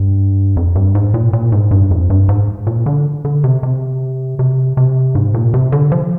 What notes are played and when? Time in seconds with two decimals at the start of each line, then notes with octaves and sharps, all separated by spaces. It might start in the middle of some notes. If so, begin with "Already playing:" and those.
Already playing: G2
0.57 F2
0.75 G2
0.95 G#2
1.14 A#2
1.33 A#2
1.52 G#2
1.71 G2
1.91 F2
2.10 G2
2.29 G#2
2.67 A#2
2.86 D3
3.25 D3
3.44 C3
3.63 C3
4.39 C3
4.77 C3
5.15 G#2
5.34 A#2
5.54 C3
5.72 D3
5.92 F3